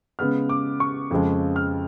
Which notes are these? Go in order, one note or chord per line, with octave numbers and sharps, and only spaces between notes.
C#3 G#3 B3 F6
D6
C#6
F2 C#3 F3 G#3
F6